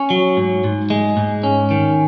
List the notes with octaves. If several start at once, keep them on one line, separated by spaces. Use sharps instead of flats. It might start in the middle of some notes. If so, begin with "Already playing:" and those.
Already playing: C#4 C#5
F#3
G#2
G#2
G#3
G#2
C#4
D#3